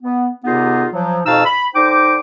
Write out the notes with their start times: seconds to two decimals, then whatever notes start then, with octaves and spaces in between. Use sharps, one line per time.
0.01 B3
0.45 D#2 C3 B3 D#4 F4 G#4
0.93 F3 F#3
1.26 F2 B2 D#4 F5 A5 E6
1.45 B5
1.75 D3 D#4 C5 G5 D6